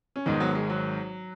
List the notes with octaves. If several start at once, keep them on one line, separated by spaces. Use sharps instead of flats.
C#4
G#1 G#2 D#3 B3 D#4
F#3 B3
G#3
F#3